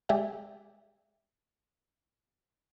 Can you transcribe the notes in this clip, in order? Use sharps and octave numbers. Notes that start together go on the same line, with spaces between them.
G#3 G4 G#4 D5 E5